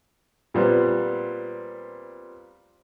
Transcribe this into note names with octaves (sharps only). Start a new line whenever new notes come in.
A#2 G3 B3 C4